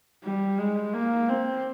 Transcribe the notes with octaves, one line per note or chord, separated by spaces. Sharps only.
G3
G#3
A#3
C4